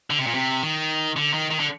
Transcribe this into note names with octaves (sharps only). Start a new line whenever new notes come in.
D3
C3
A#2
C3
D#3
D3
D#3
D#3
D3